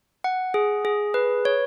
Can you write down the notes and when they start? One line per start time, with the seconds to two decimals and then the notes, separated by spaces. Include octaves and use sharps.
0.24 F#5
0.54 G#4
0.85 G#4
1.14 B4
1.45 C#5